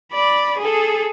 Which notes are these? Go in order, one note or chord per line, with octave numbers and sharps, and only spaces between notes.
D5 B5
G#4 A4